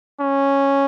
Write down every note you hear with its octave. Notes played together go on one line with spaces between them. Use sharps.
C#4